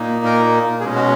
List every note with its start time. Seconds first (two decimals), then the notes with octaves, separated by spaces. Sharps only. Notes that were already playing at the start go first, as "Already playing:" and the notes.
Already playing: A#2 A#3 D#4
0.25 A#4
0.81 B2 G#3 C#4 G#4
0.95 F#4